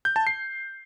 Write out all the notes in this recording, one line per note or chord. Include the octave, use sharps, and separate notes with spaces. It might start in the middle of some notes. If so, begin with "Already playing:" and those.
G6
A5
C7